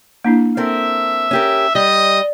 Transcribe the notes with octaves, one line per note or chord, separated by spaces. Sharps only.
A#3 D4 E4
C4 A4 A#4 E5
C#4 G4 A#4
G3 D#5